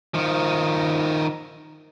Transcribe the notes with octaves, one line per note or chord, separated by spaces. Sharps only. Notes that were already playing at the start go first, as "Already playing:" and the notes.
D#3 F3